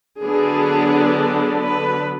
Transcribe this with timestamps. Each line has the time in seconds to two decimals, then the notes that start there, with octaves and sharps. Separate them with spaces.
0.21 D3 F#3 B3 D4 G#4
1.60 B4